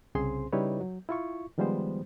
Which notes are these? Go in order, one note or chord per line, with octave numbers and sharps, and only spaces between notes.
C2 C#3 C4 G#4 C5 C6
C#3 G3 D#4 E4 B4 C#5
F#3
E4 F4 C#6
D#3 F3 G3 G#3 B3 C5